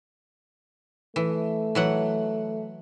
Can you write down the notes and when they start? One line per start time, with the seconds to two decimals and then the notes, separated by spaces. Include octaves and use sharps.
1.16 E3 A3
1.75 E3 F#3 F#5